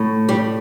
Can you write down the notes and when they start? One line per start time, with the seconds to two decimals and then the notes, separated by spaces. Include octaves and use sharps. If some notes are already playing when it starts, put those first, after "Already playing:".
Already playing: A2
0.29 G3 G4